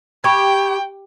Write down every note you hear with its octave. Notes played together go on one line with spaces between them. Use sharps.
G4 G5 B5 C#6 G#6